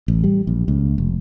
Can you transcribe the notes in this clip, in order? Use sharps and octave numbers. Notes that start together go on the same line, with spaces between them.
A1
G3
A#1
C#2
F1